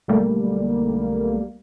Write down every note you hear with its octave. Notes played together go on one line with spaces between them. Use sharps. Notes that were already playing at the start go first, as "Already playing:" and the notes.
B1 D3 G3 A3 A#3